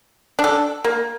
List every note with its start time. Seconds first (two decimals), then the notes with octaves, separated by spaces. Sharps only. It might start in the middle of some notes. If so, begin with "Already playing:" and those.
0.39 D4
0.44 A4
0.84 A#3